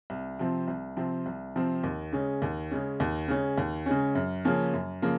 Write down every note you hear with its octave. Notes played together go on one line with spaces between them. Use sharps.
C2
C3 F3 C4
C2
C3 F3 C4
C2
C3 F3 C4
D#2
C#3 G#3 C#4
D#2
C#3 G#3 C#4
D#2
C#3 G#3 C#4
D#2
C#3 G#3 C#4
F#2
C#3 F3 A#3 C#4
F#2
C#3 F3 A#3